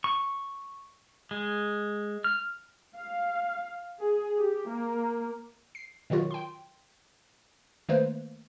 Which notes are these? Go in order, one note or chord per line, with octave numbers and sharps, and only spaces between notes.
C#6
G#3
F6
F5
G#4
G4
A#3
C7
B2 D#3 F#3 F4 F#4
G5 C6
D#3 A3 A#3 B4 C5